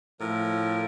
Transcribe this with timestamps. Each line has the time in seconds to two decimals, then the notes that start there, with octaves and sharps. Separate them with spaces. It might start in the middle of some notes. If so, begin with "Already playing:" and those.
0.20 A2 F3 A#4